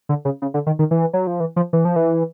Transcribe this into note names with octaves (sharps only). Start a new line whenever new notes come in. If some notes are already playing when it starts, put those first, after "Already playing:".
D3
C#3
C#3
D3
D#3
D#3
E3
F#3
F3
E3
F3
E3
F3
E3